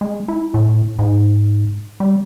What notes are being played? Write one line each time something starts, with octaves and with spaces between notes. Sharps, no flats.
G#3
E4
A2
G#2
G3